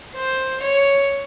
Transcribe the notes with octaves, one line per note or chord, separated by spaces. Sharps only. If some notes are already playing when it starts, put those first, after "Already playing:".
C5
C#5